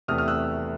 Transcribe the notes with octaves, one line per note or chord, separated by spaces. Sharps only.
E2 C3 E3 A3 D#6 F6
D#6 F6
E6 F#6